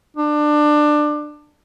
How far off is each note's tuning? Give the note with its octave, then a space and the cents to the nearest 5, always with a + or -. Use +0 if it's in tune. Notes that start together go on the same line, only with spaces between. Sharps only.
D4 +20